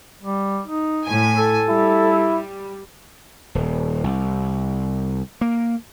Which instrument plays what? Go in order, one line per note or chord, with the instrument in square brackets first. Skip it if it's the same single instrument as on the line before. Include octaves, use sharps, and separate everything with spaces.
[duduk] G3
D#4
[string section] A2 G#5
[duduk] A4
[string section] G3 [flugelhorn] E4
[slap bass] D#1
C2
A#3